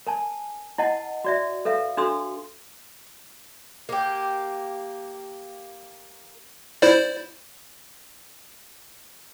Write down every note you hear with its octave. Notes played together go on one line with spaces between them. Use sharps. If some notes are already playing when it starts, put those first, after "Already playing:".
A#4 G#5 A5
E4 D#5 F#5 A5
F#4 D5 E5
A4 B4 E5 F5
D4 F#4 A4 C6 D#6 E6
A#3 G4
E4 C5 D5